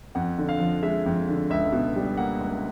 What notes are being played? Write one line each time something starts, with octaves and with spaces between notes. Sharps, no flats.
F2 F#5
D3
F5
F3
G#3 E5
F2
D3
C#2 E5
B2
G3
A#3 F#5
C#2